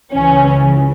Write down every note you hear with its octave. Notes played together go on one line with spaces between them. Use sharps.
C#2 C#3 E3 C#4